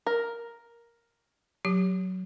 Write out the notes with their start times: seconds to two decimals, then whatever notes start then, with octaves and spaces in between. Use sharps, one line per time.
0.07 A#4
1.65 F#3 G4